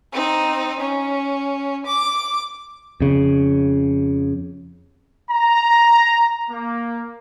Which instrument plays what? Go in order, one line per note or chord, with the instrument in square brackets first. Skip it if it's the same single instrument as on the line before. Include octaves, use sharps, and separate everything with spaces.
[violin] C4 D#4
C#4
D6
[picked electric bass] F2 C#3
[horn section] A#5
A#3